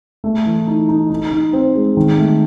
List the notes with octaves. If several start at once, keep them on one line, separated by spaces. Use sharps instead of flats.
A3
E3
D#4
D#4
D#4
D#4
C4
G#3
D#3
A3